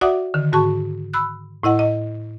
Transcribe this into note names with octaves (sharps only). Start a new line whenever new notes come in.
F#4 D5 E5 F#5 D6 D#6
D3 D#3
G#2 F#4 A5 C#6
B5 E6 F#6
A2 E4 D#5 F#5
D#5